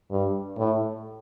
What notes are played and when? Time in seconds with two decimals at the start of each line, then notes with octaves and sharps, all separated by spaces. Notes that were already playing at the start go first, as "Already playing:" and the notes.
0.11 G2
0.57 A2